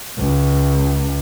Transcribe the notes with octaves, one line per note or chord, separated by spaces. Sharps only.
C#2